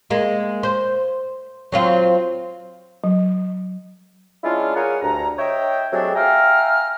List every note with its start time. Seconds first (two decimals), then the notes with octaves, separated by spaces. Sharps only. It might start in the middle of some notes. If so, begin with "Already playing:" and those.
0.10 G#3 A#3
0.63 C5
1.72 F#3 C4 F4
3.04 F#3
4.44 G#3 C#4 D4 E4 F4
4.76 G#4 A#4 C#5 F5 F#5 G#5
5.02 D2 G2 A#5
5.38 C#5 D#5 E5 G5
5.92 F#3 G#3 A3 C4 D4 G4
6.15 E5 F5 G5 G#5 A#5 F6